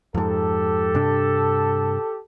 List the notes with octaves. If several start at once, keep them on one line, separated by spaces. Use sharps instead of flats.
F2 G#2 G4 A4
G2 C3 D4